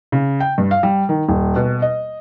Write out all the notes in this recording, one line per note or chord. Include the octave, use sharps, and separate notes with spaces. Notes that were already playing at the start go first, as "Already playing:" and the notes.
C#3
G5
G2
F5
G3
D#3
D#1
B2
D#5